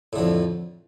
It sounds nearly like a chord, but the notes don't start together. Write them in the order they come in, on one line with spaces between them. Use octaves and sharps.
A2 D3 F2